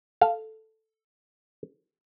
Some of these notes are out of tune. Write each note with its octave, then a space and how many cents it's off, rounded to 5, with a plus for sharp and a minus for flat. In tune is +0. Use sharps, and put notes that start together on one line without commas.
A4 +0 F5 +0